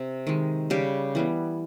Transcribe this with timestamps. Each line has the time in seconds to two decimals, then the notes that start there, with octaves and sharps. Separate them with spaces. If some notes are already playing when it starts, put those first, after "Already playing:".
Already playing: C3
0.27 D#3 G#3
0.70 C#3 G3 G4
1.15 E3 G3 B3